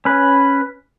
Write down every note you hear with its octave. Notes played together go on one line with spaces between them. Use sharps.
C#4 B4